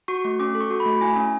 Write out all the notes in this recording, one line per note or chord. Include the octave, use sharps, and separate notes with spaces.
F#4 C#6
A3
C#4 D6
A4
C#6
F#4
B5
A3
E4 G#5
C#4